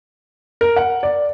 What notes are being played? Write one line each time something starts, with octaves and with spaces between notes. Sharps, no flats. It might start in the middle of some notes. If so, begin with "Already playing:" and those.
A#4
F#5
D5